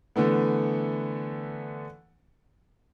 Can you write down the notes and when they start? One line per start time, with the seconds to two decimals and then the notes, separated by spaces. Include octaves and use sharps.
0.16 D3 E3 A3 B3